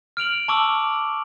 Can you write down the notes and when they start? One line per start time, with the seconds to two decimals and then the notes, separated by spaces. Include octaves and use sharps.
0.17 F6 D7 F7 F#7
0.48 A5 C#6 D6 E6 F#7